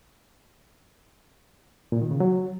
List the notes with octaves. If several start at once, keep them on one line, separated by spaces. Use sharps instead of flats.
A#2
D#3
C#3
F#3